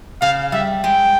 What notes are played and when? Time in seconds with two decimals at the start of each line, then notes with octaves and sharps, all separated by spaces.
0.22 C#3 F5
0.52 G3 E5
0.84 G#3 G5